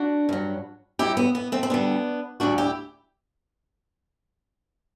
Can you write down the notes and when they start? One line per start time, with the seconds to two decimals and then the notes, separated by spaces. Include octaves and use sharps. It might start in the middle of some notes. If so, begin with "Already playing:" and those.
Already playing: D4 F#4
0.29 G2 F#3
0.99 G2 F#3 E4 G4
1.17 B3
1.35 B3
1.52 A3 C4
1.63 C4
1.70 D2 D3 G3 B3 D4
2.40 D2 D3 G3 D4 F#4
2.58 E4 G4